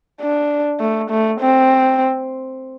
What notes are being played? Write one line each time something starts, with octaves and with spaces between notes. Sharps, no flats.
D4
A3
A3
C4